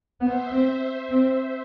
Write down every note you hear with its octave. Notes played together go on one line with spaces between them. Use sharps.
B3 C5 E5
C4
C4